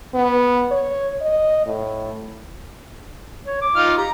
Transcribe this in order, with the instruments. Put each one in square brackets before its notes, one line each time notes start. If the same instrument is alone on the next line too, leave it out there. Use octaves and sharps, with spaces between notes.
[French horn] B3
C#5
D#5
A2
[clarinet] C#5
D6
[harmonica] D#4 F4 F6
[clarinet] G4 [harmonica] A#5